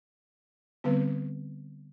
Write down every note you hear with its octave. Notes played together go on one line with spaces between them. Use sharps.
D3 G3 B3 C4 B4